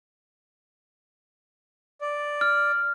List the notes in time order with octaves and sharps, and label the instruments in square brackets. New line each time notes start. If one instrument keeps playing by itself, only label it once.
[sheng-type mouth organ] D5
[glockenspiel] F6